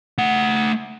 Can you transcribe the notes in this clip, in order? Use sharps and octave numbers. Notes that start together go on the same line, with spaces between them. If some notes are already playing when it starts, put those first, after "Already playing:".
A3 F#5